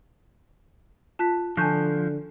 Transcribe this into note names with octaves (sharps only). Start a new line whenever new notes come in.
F4 A5 F#6 B6
D3 F3 G#5 A5 C#6 F#6 G6